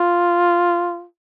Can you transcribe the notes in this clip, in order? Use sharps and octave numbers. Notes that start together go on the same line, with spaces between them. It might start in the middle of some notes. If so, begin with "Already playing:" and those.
Already playing: F4